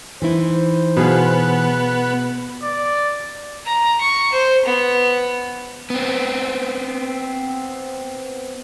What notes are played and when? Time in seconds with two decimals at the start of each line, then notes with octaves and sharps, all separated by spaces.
0.22 E3 D#4 E4 C5
0.97 B2 B3 G#4 F5
2.63 D5
3.66 A#5
4.01 C#6
4.32 C5
4.65 B3
5.90 B3 C4